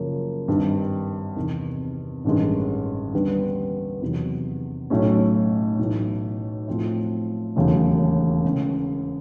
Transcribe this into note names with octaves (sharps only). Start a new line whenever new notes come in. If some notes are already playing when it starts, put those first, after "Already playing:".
Already playing: F#2 C#3 F3 A#3
G#1 G2 D#3 G3
E2 C3 D#3
A1 G2 D#3 G#3
D#2 D3 G3 B3
E2 C3 D#3 F#3 B3
B1 A2 F#3 A3 C#4
B1 A2 E3 A3
A2 F3 A3 C4 E4
E1 D#2 C#3 F#3 A3
C#3 E3 G#3 C#4